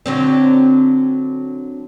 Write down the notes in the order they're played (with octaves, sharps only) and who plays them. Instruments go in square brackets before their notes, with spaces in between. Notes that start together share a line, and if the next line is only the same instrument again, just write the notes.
[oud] D3 F#3 C4